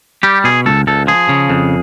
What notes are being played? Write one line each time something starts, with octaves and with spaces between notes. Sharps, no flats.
G3 G4
B2 G#4
C#2 A4
C#2 A4
F3 G#4
C#3
F2